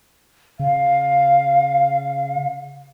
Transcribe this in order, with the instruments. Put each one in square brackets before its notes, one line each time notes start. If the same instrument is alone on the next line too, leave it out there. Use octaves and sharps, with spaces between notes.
[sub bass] C#3 [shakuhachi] F5